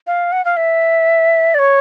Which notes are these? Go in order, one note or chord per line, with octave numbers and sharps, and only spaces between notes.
F5
F#5
F5
E5
D5
C#5